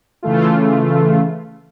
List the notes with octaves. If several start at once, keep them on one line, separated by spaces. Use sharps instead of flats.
C#3 E3 A3 F4